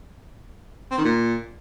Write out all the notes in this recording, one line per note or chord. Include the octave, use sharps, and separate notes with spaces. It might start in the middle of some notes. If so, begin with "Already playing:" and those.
C4
D#3
A#2